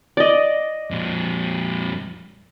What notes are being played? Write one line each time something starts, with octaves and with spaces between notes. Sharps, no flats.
D5 D#5
F2 A#2